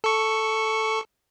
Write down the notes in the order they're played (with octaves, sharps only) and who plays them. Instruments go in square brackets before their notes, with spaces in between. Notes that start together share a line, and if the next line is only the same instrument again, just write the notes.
[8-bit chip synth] A4 C#6